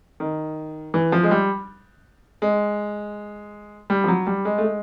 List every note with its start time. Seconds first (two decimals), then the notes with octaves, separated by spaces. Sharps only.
0.20 D#3
0.94 E3
1.12 F3
1.23 G#3
1.31 G3
2.42 G#3
3.90 G3
4.04 F3
4.08 F#3
4.27 G3
4.45 G#3
4.58 A3
4.63 G#3